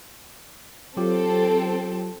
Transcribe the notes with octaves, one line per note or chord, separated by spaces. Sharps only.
F#3 C4 F4 G4 A4